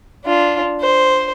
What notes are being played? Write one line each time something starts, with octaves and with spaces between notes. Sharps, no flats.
D4 F4
C5